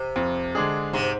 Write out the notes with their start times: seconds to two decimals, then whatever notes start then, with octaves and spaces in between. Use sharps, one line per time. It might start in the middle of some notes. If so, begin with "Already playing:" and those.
Already playing: C3
0.16 F2
0.55 D3 G#3 D4 G#4
0.93 G#2 C3